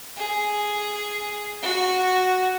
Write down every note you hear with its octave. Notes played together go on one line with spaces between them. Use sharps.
G#4
F#4